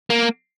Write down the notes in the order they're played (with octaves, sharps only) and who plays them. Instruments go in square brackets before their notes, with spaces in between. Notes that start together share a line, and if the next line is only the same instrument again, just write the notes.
[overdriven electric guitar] A#3